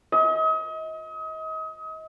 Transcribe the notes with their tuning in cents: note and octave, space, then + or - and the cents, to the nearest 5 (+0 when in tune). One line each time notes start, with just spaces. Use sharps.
D#5 +35